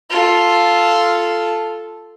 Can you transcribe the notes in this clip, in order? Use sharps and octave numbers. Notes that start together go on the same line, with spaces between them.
F4 A4